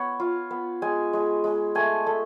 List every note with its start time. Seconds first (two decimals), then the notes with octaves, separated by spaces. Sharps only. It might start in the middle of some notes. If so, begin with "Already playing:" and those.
Already playing: B3 C#5
0.20 F4
0.51 B3
0.82 G#3 G#5
1.13 G#3
1.44 G#3
1.75 A3 G#5
2.06 A3